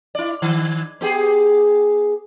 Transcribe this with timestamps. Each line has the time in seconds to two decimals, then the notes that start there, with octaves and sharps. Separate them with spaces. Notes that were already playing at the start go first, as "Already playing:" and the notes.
0.15 E4 D5
0.42 D#3
1.01 B3 G4 G#4